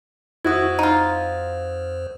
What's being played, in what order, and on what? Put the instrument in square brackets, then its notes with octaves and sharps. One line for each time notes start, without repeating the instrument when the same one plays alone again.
[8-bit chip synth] F2 C5 [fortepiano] E4 F#4 [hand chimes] D#6 G#6
[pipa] D#4 F4